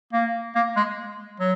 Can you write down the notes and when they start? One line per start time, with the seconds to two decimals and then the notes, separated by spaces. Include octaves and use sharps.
0.13 A#3
0.55 A#3
0.76 G#3
1.40 F#3